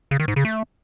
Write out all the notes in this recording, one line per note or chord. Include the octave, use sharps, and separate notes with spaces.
C#3
D#3
G#2
C#3
A3